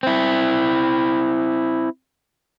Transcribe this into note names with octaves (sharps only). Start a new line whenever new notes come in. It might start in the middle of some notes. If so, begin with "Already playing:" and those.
C4 E4